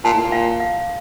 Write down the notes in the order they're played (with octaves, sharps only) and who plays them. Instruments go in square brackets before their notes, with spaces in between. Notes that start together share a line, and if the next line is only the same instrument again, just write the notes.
[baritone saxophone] A#2 [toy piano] A5
[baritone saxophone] A2
A#2
[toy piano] F5
F5